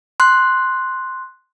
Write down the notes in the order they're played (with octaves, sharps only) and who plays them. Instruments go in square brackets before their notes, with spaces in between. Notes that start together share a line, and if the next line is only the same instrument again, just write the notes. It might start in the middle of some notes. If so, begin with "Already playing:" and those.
[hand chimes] C6 F#6